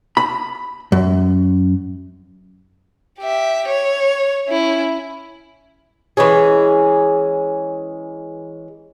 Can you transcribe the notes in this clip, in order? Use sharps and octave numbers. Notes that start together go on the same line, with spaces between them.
B5
F#2
G4 E5
C#5
C#4 E4
E3 G#3 C#4 G#4